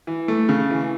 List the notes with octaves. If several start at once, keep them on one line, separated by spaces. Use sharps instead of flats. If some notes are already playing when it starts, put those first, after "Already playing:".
E3
A3
C#3
E3